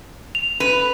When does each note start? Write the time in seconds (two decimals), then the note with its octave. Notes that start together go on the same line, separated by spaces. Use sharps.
0.35 F7
0.60 B4